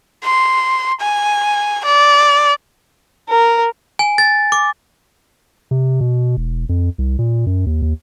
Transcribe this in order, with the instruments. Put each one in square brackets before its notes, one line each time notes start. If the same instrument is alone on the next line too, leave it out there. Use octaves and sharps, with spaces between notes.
[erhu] C6
G#5
D5
[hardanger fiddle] A#4
[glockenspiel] G#5
A6
D6
[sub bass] C3
B2
E1
F2
C2
A#2
F#2
D#2
D#2